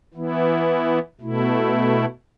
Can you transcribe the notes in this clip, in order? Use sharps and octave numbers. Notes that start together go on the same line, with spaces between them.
E3 B3 E4
B2 A3 E4